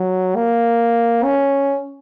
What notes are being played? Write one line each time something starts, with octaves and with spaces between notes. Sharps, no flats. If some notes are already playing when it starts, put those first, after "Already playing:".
Already playing: F#3
A#3
C#4